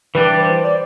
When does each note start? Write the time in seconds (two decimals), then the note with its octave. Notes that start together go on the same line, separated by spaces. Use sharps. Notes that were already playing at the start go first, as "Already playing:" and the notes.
0.15 E3 G3 D4 G4 B4
0.40 C5
0.64 D5